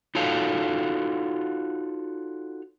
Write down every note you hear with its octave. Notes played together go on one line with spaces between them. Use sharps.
D#4 F4 F#4 A4 C#5 F5